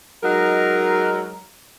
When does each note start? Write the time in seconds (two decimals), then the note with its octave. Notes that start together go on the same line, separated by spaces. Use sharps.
0.23 F#3 G#3 D#4 A#4